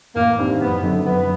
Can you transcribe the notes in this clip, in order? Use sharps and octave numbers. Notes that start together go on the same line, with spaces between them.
A1 A#3
G2 D#3 G3 C4
F#1 B3
F#2 D3
F#1 B3